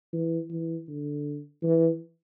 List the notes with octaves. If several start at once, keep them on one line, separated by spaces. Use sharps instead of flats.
E3
E3
D3
E3